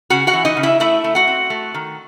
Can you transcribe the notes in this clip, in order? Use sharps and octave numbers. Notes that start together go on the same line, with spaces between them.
C#3 F#4 F#5
F#4 F#5
E3
D#4 D#5
C#3
E4 E5
A3 E4 E5
A3
F#4 F#5
C4
A3
D#3